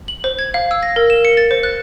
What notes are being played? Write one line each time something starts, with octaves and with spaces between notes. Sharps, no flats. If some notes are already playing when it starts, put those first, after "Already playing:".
F#7
C5
G#6
F5
E6
A#6
A#4
E7
C#7
A6
C5
F#6